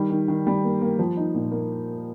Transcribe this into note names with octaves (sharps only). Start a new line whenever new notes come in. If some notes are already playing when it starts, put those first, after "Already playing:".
Already playing: D#3 G3
D#3
D#3
G3
A#3
A#3
F3
D#4
A#2
A#3